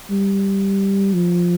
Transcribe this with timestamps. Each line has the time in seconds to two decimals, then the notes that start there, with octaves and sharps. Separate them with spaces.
0.10 G3
1.14 F3